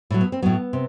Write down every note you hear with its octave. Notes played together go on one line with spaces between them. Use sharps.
A2 F#3
B3
C4
A2 F#3 B3
C3